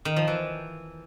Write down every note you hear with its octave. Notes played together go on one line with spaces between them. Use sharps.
D#3
F3
E3